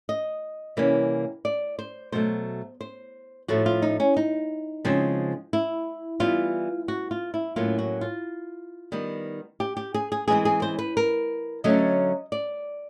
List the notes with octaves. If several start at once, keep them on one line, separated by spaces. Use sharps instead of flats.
D#5
C3 E3 G3 A#3 C#4
D5
C5
B2 F#3 A3 C5
C5
A2 F3 A3 F#4
F4
D#4
C#4
D#4
C#3 F3 G#3 C4
E4
E3 G3 B3 F4
F#4
F4
E4
A2 F#3 A#3 C#4 F4
F#4
F4
D#3 G3 B3
G4
G4
G#4
G#4
E3 G#3 C4 G#4
G#4
C5
B4
A#4
D3 F#3 A3 C#4 D#5
D5